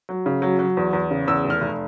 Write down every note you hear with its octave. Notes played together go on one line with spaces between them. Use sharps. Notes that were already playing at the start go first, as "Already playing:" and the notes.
F#3
C#3
F#3
F#3
E2
E2
C#3
E2 E6
F1
F6
F1